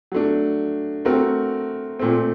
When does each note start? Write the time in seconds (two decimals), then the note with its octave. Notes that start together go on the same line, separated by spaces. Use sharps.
0.12 F#3 A3 D4
1.05 A3 C4 F#4 A#4
1.99 A#2 A3 C4